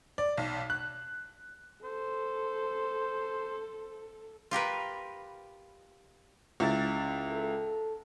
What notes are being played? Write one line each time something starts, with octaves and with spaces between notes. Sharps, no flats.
D5
B1
F#6
A4 C5
F4 G4 A#4 B4
C#2 E4 A6
A4